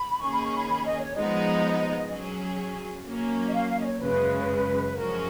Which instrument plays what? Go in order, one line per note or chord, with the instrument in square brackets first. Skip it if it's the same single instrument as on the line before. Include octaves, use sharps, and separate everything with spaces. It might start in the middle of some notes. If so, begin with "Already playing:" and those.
Already playing: [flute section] B5
[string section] D#3 A#3 C#4 G#4 [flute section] C#6
[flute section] B5
C#6
B5
B5
D#5
C#5
[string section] F3 G#3 B3 D#4 [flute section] D#5
[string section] F#3 C#4 G#4
F#3 A#3 C#4
[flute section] D#5
F5
F5
D#5
C#5
[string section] F#2 C#3 G#3 [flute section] B4
[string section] F#2 F3 G#3 C#4 F#4 [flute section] A#4